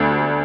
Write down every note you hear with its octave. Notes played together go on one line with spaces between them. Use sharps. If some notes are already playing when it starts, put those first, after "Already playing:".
Already playing: D2 D4